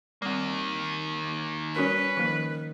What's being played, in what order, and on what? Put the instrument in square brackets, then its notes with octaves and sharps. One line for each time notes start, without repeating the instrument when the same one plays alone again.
[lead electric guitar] D#3 A#3 [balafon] G3 C4
[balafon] G3 F#4 A#4 [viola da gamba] C#4 [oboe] B4
[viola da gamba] D#3 [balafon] F3 A#3